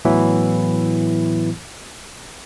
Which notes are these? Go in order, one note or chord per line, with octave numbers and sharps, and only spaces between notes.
A2 E3 F#3 B3 E4